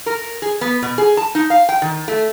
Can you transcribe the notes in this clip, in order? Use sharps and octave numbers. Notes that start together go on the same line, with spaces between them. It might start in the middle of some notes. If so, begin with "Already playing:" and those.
A#4
G#4
B3
B2
G#4
A5
D#4
F5
G5
D#3
A3